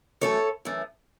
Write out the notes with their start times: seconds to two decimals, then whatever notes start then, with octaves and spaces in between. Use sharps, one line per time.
0.21 F#2 E3 A3 A4 C#5
0.65 F#2 E3 A3